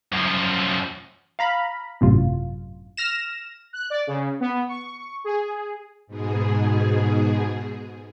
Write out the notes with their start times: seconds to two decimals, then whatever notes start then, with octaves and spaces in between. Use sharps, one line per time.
0.12 F#2 F3
1.39 F5 A#5 B5
2.01 G#1 F#2 A2 C3 F4
2.97 F6 A#6 E7
3.73 F#6
3.90 D5
4.07 C#3
4.40 B3
4.68 C#6
5.24 G#4
6.07 G#2 B2 G#4